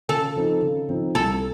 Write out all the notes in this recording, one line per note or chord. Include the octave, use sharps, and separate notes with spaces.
C#3 A4
F3 C4 D#4
C#3
F3 C4 D#4
C2 A4